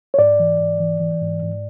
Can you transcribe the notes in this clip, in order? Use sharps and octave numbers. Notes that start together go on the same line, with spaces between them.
C#5
G#2 D5
E3
G#2
E3
E3
G#2
G#2